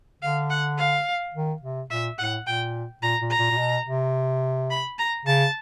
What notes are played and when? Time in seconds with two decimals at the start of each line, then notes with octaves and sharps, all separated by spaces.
0.22 D3 F5
0.50 F#5
0.78 F5
1.34 D#3
1.62 C3
1.90 A#2 E5
2.18 A2 F#5
2.47 A#2 G5
3.02 A#2 A#5
3.21 A#2
3.30 A#5
3.39 A#2
3.51 A#2
3.58 B2
3.86 C3
4.70 B5
4.98 A#5
5.26 C#3 A5